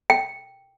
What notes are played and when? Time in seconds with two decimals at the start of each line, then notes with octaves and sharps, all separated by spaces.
0.10 G5